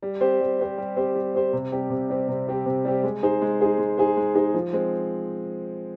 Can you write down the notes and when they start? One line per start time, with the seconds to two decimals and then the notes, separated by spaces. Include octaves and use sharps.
0.03 G3
0.21 C4 G4 C5
0.41 G3
0.59 C4 G4 C5
0.78 G3
0.96 C4 G4 C5
1.15 G3
1.34 C4 G4 C5
1.53 C3
1.72 G3 C4 G4
1.90 C3
2.09 G3 C4 G4
2.28 C3
2.47 G3 C4 G4
2.66 C3
2.85 G3 C4 G4
3.04 G#3
3.23 D#4 G#4 C5
3.42 G#3
3.60 D#4 G#4 C5
3.78 G#3
3.97 D#4 G#4 C5
4.17 G#3
4.35 D#4 G#4 C5
4.54 F3
4.73 G#3 C4